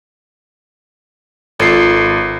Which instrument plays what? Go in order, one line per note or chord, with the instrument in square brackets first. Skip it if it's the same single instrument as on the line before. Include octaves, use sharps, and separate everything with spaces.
[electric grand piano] G#1 C7 [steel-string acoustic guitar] F4 A4 B4